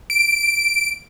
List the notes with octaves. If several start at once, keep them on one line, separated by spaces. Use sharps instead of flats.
D7